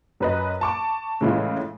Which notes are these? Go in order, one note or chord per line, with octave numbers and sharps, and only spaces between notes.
F#2 B4 D#5
A5 C#6 D6
A2 C#3 E3 G#3 E4 F4